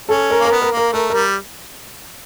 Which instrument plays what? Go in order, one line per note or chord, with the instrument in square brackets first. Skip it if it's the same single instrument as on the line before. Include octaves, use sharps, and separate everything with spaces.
[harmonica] C#4 [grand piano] A4
[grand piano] A#4
[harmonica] A#3
[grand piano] A#4
[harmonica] B3
[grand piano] A#4
[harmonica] A#3
[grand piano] A#4
[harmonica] A3 [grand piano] A#4
[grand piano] A#4
[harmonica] G3